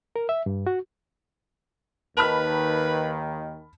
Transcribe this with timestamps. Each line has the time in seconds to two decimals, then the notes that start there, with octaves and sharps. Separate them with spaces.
0.16 A#4
0.29 E5
0.46 G2
0.67 F#4
2.17 D#2 D#3 B4 A5 B5 F6